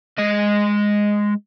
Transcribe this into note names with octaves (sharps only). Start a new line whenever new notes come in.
G#3 D#5